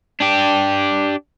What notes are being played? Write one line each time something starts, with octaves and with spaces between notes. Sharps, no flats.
D4 G4